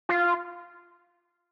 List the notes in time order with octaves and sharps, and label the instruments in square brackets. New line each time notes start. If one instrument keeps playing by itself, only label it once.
[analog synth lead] F4